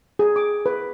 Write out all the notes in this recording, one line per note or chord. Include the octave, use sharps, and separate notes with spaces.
G#4
D6
B4